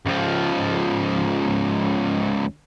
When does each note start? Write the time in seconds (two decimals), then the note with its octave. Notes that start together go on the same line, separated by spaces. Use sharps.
0.06 C#2 F3